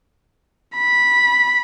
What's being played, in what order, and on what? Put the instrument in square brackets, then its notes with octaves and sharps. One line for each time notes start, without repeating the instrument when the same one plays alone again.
[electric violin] B5